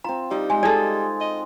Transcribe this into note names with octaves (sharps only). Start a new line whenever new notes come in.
C4 F4 A#5
G3 D#4
G#3 G#5
G#4 A4 D5
D#5